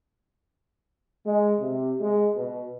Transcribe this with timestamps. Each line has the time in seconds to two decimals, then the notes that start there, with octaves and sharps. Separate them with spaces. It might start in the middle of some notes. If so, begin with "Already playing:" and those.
1.26 G#3
1.60 C3
2.01 G#3
2.36 B2